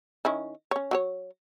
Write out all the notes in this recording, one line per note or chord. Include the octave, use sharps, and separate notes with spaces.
D#3 C#4 E4
C#4 C#5
F#3 F#4 C#5